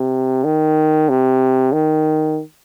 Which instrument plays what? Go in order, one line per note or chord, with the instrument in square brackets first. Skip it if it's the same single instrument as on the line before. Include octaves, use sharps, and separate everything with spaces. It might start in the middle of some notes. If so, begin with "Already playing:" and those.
Already playing: [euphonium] C3
D#3
C3
D#3